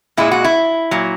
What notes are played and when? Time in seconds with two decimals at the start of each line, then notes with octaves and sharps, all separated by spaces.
0.17 A#2 G#3 E4
0.31 F#4
0.44 E4
0.91 A#2 F#3